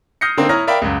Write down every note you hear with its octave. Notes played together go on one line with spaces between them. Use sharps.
D#6 F6 G6 A#6 C7 C#7
D3 A#3 C4 D#4
E4 C#5 A#5 D#6 F6 A#6
A#4 D5 E5 F5 G5 B5
C#2 F#2